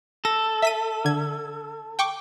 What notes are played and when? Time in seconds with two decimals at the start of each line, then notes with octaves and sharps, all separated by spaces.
0.25 A4 A#6
0.62 E5 B6 D#7
1.05 D3 G#6
1.99 G5 C#6 D6